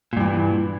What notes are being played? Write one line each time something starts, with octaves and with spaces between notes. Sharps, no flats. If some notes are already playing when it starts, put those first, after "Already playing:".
G2 A#2 E3